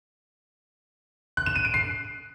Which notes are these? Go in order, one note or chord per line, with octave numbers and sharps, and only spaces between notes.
F#6
E7
D#7
D7
C7